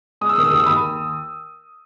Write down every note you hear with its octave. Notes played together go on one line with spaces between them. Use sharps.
G#3 D#6
E6
D#3 D#6
E6
D#2 D#6
E6
D#2 B5 D#6